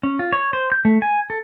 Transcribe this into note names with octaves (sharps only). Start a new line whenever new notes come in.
C#4
F4
C#5
C5
G6
A3
G#5
A4